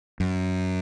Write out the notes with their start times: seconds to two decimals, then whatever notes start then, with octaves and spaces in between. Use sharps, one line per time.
0.20 F#2